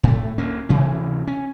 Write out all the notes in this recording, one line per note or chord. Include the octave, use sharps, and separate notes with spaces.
A2 A3
D2 A#3 C#4
D2 C3 E3 C#4
C#4